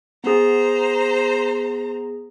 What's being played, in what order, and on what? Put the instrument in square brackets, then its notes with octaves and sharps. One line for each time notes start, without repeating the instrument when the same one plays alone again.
[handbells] B3 G#4 [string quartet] C5 A#5